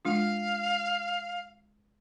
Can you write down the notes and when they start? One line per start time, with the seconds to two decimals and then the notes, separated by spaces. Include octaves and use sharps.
0.05 G#3 D4 F4 F5